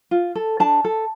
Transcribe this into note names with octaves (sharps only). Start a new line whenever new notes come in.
F4
A4
D4 A5
A4